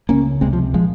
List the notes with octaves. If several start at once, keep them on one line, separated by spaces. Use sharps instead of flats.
C#2 C#3 A#3 C#4
C#2 C3 G#3 C4
F3
A#2 F3 G#3